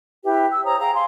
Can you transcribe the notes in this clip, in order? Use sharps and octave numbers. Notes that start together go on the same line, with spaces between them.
E4 G4 B4 E5
G5 E6
C5 C#5 A#5 D#6
G#4 F5 G5 A#5
F5 G#5 C6